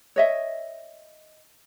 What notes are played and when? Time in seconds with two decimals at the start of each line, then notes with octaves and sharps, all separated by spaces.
0.16 C#5 D#5 E5